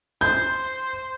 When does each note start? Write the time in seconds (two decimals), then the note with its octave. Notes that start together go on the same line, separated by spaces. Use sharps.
0.21 C5 G6